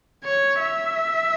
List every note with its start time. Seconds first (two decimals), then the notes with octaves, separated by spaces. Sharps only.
0.25 C#5
0.60 E5